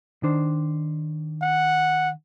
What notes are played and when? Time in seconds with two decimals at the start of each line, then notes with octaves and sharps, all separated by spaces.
0.23 D#3 D4 C5
1.42 F#5